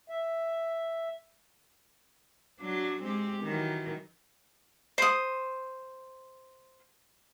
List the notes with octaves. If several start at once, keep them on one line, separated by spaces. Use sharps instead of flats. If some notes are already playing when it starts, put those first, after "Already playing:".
E5
F#3 D4
G#3 C4 G4
D#3 E3 F#3
C5 D#6